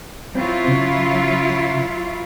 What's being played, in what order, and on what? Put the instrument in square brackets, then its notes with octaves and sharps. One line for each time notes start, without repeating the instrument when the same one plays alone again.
[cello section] F#3 E4 F4 [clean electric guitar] C4
[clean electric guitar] C#3